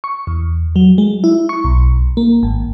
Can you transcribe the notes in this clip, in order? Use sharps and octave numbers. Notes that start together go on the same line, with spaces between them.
C#6
E2
F#3
G#3
E4
C#6
B1
A#3
G#1